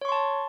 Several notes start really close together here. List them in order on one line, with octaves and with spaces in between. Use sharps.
C#5 C#6 C6 A5